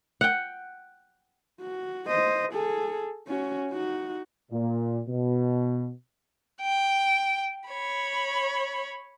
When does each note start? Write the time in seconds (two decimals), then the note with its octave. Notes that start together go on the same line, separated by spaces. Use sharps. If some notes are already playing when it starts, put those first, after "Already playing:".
0.21 F#5 G5
1.61 F#4
2.08 C5 D#5
2.53 G#4 A4
3.27 C#4 F#4
3.71 D#4 F#4
4.51 A#2
5.08 B2
6.61 G5
7.68 C#5 B5